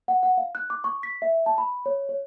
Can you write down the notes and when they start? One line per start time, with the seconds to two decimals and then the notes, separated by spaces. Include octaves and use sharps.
0.08 F#5
0.23 F#5
0.37 F5
0.55 F#6
0.70 D6
0.84 C#6
1.03 B6
1.22 E5
1.46 A5
1.58 B5
1.86 C#5
2.09 C#5